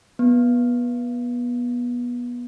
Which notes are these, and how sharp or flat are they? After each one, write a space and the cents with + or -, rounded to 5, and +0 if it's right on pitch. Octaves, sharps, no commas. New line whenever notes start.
B3 -25